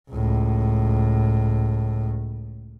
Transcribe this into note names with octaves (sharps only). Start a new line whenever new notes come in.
C#2 A2